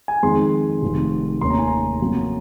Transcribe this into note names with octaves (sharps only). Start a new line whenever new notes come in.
G#5
F2 D#3 G#3 C4 C6
F1 F2 D#3
F1 D#2 D#3 A#3 C#4 C6
A#5
G#5
A#5
F2 C3 F#3 A#3 C#4